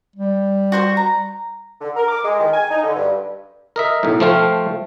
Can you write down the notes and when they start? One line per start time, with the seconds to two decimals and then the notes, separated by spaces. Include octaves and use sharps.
0.16 G3
0.72 F#4 C5 C#6
0.97 A#5
1.81 D3
1.96 A#4
2.08 D6
2.25 G#3
2.40 D#3
2.53 G#5
2.71 D#4
2.83 D3
2.96 G2
3.76 A#4 D#5 E5
4.03 B1 A2
4.20 F3 A3 C5 F5 G5